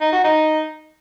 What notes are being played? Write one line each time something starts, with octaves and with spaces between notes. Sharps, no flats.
D#4
F#4
D#4